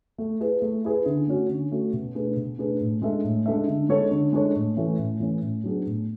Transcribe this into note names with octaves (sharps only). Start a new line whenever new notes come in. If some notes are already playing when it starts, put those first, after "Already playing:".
A3
E4 G#4 B4
A3
E4 G#4 B4
D3
A3 C#4 F#4
D3
A3 C#4 F#4
B2
A3 D4 G#4 B4
B2
A3 D4 G#4 B4
A2
G#3 D4 A4 E5
A2
G#3 D4 A4 E5
D3
G#3 D4 A4 C#5
D3
G#3 D4 A4 C#5
A2
E3 A3 C#4
A2
E3 A3 C#4
A2
F#3 B3 D4 G#4
A2